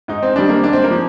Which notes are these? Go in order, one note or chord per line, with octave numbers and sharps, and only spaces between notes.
G#2 D#4
C4
D#3 G3 D4
A#3
G#2 D4
C4
A#3
F3